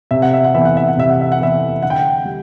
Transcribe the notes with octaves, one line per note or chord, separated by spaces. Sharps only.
C3 E5
F#5
E5
F#5
E3 B3 E5
F#5
E5
F#5
C3 E5
F#5
E5
F#5
E3 B3 E5
D3 F#5
G5
F#5
G3